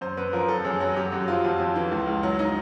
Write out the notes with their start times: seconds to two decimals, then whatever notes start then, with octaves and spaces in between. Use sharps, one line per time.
0.01 F#2 C5
0.17 F#2 B4
0.33 F3 A#4
0.48 F#2 A4
0.65 F#2 G#4
0.80 F#3 F#4
0.96 F#2 G4
1.12 F#2 F#4
1.28 F3 F4
1.44 F2
1.60 F2
1.76 E3
1.91 C#2
2.07 C#2
2.23 F#3
2.39 D#4